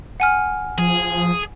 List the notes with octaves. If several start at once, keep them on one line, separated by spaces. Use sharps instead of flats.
F#5 G#5 F6
F3 G#4